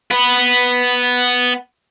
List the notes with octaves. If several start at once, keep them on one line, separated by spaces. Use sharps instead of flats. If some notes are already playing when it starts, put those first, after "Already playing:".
B3 B4